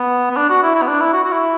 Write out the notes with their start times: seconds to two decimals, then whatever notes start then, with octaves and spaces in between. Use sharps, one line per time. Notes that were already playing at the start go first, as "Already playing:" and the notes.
Already playing: B3
0.31 B3
0.37 D4
0.50 F#4
0.63 E4
0.75 E4
0.82 B3
0.88 D4
1.01 E4
1.13 F#4
1.24 F#4
1.32 E4